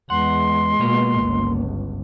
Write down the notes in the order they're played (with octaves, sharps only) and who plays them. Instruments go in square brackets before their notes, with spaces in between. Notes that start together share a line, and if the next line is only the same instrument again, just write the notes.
[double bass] E2 [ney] G#3 [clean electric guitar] F#5 [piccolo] C6
[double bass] B2 [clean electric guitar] A#3 F4 C#5
[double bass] G1 C#2